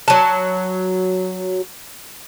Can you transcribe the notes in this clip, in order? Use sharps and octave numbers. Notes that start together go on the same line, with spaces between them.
F#3 A5